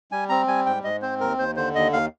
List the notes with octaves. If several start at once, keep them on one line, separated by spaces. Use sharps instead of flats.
G3 G#5
C4 A#5
G3 G#5
G#2 G5
G#2 D#5
C4 C5
D#2 A#4
D#2 C5
D3 C5
D#2 D#5
D#2 F5